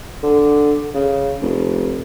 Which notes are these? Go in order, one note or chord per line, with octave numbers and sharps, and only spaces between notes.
D3
C#3
F1